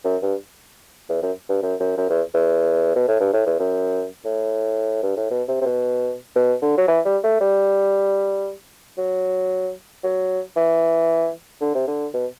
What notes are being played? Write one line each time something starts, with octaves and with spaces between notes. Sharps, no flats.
F#2
G2
E2
F#2
G2
F#2
F#2
F#2
E2
E2
B2
A2
G2
A2
E2
F#2
A2
G2
A2
B2
C3
C3
B2
B2
D3
F#3
E3
G3
A3
G3
F#3
F#3
E3
D3
C3
D3
B2